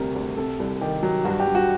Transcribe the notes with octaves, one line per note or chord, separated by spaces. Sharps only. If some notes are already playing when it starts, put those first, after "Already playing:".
Already playing: D2 C3 G3 A#4
D2
C3 A4
C2
D#3 G4
F#3
G2 F#4
G4
G2
F#4